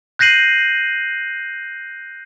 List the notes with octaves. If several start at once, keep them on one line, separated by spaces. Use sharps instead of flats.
F#6 G6 A#6 C7 D#7 F#7